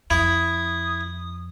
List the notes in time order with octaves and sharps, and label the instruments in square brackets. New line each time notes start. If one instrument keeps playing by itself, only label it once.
[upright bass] F2 [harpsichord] E4 [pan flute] D#6